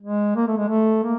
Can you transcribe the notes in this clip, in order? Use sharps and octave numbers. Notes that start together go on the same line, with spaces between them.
G#3
A#3
A3
G#3
A3
A#3